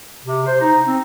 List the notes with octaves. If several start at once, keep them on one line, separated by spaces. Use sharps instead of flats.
C3
C5
D#4
C4